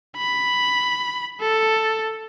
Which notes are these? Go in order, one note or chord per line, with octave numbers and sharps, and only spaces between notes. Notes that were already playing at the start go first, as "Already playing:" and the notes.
B5
A4